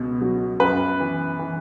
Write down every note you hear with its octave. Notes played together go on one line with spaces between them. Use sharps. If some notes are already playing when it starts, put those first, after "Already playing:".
Already playing: C#2 B2
F#3
F#2 B4
E3
E3